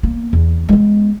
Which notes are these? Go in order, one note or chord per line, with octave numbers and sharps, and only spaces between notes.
A#3 B3
E2
G#3 B3